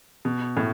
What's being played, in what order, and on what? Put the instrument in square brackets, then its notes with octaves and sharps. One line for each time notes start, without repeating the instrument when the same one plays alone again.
[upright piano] B2
A2